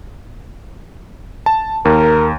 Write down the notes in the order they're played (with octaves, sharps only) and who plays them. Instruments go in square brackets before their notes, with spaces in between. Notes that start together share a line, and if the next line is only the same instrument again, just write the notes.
[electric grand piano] A5
[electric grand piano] D#2 [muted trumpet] A#4